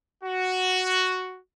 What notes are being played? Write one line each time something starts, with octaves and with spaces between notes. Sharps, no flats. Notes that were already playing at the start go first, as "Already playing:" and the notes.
F#4